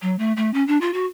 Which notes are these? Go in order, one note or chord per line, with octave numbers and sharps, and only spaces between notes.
F#3
A3
A3
C#4
D4
F4
F#4